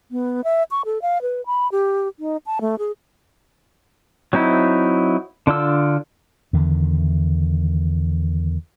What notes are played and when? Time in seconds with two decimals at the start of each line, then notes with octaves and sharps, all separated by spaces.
0.11 B3
0.44 E5
0.71 C#6
0.85 A4
1.02 F5
1.22 B4
1.46 B5
1.72 G4
2.19 D#4
2.46 A5
2.61 A3
2.79 G#4
4.33 F#3 C4 D#4 E4
5.47 D3 D4 F4 E6
6.53 E2 D3 D#3